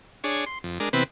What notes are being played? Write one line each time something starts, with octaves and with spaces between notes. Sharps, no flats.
D4 G#4 C#5
C6
F2
G#3 D4 A#4
C3 E3 B3 C4 B4